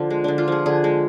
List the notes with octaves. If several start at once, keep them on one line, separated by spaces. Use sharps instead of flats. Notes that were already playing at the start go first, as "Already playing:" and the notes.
Already playing: D3 F3
G#3
D3 D4
F4
F3 G#4
D3 G#4
G#3